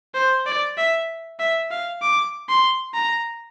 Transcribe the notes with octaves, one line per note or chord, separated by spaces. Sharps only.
C5
D5
E5
E5
F5
D6
C6
A#5